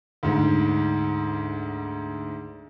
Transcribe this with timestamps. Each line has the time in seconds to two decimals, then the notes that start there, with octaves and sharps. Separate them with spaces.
0.23 D2 G#2